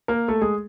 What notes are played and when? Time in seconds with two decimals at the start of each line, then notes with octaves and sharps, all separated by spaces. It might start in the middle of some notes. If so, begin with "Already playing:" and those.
0.08 A#3 A#4
0.28 A3 A4
0.42 G#3 G#4